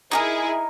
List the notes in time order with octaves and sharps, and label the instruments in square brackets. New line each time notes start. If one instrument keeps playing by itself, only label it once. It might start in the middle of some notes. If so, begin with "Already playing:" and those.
[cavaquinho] D#4 G4 A#4 [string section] E4 G#4